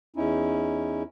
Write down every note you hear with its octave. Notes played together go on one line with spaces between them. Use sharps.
E2 C#4 D#4 E4